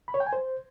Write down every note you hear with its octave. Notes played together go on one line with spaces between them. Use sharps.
B5
C#5
G5
G#5
C5